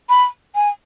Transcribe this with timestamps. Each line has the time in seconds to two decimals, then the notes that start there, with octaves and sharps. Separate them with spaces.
0.09 B5
0.55 G#5